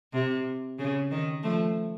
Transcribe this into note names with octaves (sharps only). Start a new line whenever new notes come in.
C3
C#3
D#3
F3 A3